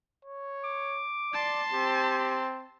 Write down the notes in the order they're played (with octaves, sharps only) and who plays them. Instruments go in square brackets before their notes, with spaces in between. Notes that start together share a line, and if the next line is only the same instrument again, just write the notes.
[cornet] C#5
[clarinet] D6
[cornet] D5 [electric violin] A5 C6
[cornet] C4 [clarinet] G4